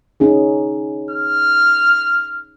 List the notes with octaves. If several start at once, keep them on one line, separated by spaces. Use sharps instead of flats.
C#4 D#4 G#4
F6